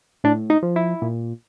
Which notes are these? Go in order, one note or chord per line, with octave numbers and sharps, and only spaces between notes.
A2 D4
D#4
F3
E4
A#2